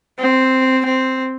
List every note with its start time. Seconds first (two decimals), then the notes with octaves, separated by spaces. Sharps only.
0.19 C4
0.85 C4